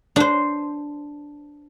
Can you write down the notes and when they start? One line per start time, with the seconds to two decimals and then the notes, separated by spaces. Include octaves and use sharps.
0.16 D4 C5